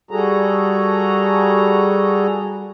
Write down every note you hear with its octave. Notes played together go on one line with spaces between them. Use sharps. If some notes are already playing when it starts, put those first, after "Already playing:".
G3 F#4 G#4 A4 A#5